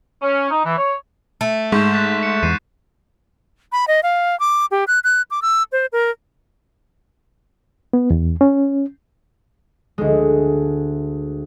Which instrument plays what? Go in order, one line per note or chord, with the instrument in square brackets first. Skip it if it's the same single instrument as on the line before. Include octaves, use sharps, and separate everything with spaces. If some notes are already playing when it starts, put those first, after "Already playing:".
[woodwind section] C#4
D#4
E3
C#5
[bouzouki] A3
[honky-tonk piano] G#2 [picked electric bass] G#3 [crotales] C#6 G6 E7
[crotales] F#6 A6 B6
C#7
[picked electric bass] E2 [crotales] C7 D#7
[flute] B5
D#5
F5
D6
G4
F#6
F#6
D6
E6
C5
A#4
[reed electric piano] B3
E2
C#4
[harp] D2 G#3